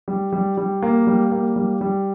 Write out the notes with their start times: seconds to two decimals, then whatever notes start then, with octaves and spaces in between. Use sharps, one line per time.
0.08 G3
0.33 G3
0.57 G3
0.82 A#3
1.07 G3
1.32 A#3
1.56 G3
1.81 G3